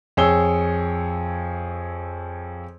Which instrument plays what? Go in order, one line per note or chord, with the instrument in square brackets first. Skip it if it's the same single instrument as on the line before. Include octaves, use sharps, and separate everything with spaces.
[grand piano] F2 G#4 C#5 E6 G7